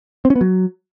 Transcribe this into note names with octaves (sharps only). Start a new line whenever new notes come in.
C4
C#4
B3
F#3